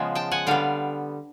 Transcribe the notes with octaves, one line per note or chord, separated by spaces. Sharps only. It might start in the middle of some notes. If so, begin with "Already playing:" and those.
Already playing: C#3 F3 G#3 B3
G5 A5
F#5 G#5
D3 G3 B3 F5 G5